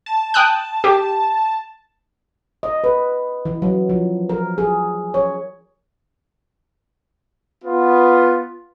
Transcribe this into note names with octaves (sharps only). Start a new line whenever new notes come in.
A5
G5 D#6 F#6
G4
D#5
B4
E3
F#3
F3
A#4
G#4
C#5
B3 F4